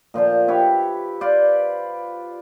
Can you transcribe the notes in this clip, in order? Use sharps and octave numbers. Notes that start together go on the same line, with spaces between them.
A#2 F3 C5 A5
G4 B4 C#5 E5
F4 B4 C5 D5